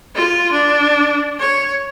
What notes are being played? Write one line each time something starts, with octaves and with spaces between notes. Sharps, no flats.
F4
D4
C#5